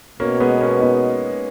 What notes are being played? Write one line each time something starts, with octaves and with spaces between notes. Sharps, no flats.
B2 A#3 C#4
G#3 B3
A#3 C#4
B3 D#4